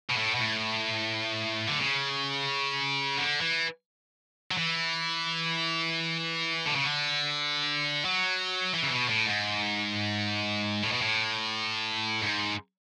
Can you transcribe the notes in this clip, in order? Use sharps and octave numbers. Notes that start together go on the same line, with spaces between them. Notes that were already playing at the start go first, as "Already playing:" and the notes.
B2
A2
B2
A2
D3
C#3
D3
E3
F#3
E3
D3
C#3
D3
F#3
E3
C#3
B2
A2
G#2
A2
B2
A2
G#2